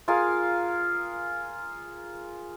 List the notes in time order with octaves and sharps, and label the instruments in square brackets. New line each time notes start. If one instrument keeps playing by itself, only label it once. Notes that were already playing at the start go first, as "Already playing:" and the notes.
[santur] F4 G#4 A#4 F5